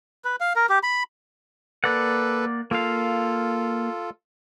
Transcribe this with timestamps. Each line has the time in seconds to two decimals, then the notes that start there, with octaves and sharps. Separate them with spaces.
0.25 B4
0.40 F5
0.56 A#4
0.69 G4
0.83 B5
1.84 A#3 A4 B4 D5 F#5
2.71 A#3 F4 A4 F5